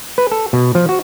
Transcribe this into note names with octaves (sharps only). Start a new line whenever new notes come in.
B4
A4
B2
F3
F#4